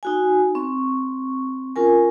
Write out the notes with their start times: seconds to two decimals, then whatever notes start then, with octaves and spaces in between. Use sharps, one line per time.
0.03 D#4 F#4 G#5
0.55 C4 C#6
1.76 C#4 F4 A#4 G#5